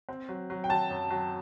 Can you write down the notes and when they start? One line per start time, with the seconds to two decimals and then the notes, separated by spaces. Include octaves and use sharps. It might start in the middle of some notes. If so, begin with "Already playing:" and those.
0.09 C4
0.29 F#3
0.50 F#3
0.64 G5
0.69 F#3 A5
0.90 F#2
1.10 F#3